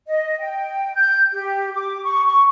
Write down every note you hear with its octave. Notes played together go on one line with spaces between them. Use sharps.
D#5
G5
G6
G4
D6
C#6
C#6